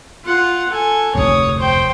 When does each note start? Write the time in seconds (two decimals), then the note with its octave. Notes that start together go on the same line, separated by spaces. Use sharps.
0.25 F4 F#5
0.72 A4 G#5
1.15 F1 D2 G2 C#5 D#6
1.59 C5 G5